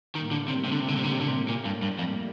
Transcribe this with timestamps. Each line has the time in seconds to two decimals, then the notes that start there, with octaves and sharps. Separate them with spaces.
0.15 A2 D#3 G3 A#3
0.31 D3
0.48 C3
0.65 C3
0.72 D3
0.80 C3
0.88 D3
0.96 C3
1.04 D3
1.12 C3
1.20 D3
1.28 C3
1.48 A#2
1.65 G2
1.82 G2
1.98 F2